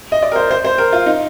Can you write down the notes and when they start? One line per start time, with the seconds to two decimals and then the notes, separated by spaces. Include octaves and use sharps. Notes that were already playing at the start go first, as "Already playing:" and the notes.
0.12 D#5
0.22 D5
0.32 A#4
0.36 C5
0.51 C5
0.65 C5
0.78 A#4
0.92 F4
1.06 D#4